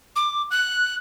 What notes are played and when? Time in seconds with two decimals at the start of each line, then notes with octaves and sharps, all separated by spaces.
0.16 D6
0.51 F#6